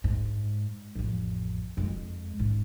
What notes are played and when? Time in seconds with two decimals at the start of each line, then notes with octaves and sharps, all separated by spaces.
0.04 G#2
0.95 A1 F2
1.77 F2 G#3
2.39 G#2 C#4